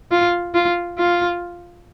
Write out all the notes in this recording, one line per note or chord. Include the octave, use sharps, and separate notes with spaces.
F4
F4
F4